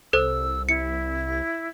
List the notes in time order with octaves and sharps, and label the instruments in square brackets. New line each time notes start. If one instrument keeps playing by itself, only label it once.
[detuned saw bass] C2 [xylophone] A4 C5 [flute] E6
[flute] E4 [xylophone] C#7